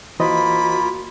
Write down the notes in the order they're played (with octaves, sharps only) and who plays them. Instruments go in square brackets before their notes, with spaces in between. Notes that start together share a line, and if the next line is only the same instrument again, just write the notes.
[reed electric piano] E3 C5 D#5 [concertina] A#3 F4 [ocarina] F#4 [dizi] B5